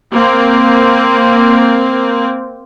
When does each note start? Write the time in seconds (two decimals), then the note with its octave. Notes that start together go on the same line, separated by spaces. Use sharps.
0.12 A#3 C4